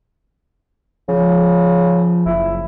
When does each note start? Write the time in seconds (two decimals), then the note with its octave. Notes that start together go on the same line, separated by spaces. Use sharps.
1.09 C#3 F3
2.26 F#1 E4